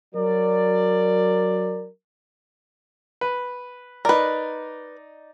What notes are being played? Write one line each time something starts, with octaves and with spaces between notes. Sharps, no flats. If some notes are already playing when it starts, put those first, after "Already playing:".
F#3 A#4 D5
B4
D#4 A#4 B4 D5